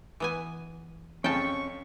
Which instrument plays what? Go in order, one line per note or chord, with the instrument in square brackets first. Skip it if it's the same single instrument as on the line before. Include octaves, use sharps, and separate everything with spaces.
[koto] E3 B3 G#5
[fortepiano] F2 C#3 [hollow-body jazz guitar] C#4 [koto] G5 A5 [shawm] C#6